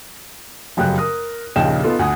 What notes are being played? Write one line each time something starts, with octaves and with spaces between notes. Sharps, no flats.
F1 F#2 C#3 G5 F#6
A#4 D#6
A#1 D#2 C#3 D#5 G5 E7
B3 D#4 F4 A4
D2 F#5 G#5 D#6